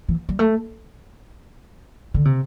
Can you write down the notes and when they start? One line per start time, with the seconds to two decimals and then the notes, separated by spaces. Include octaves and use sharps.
0.09 E3
0.29 G3
0.39 A3
2.14 D3
2.25 C3